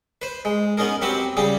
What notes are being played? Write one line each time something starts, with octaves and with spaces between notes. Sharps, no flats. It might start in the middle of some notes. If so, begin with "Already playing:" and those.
B4 C5
G#3
B3 C#4 D#4 G#4 A#4
F#3 C4 F#4 G4 B4
C#3 G3 G4 G#4